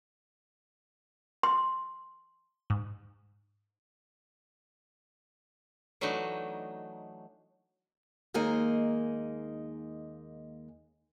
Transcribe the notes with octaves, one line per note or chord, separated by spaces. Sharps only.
C6
G#2
E3 F#3 A3 D4 D#4
D#2 G#3 A#3 D#4 G#4